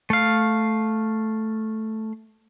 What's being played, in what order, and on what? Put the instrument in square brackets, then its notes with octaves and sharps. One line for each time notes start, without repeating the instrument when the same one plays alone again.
[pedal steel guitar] A3 F5